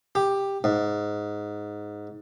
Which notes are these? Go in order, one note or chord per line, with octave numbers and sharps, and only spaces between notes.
G4
G#2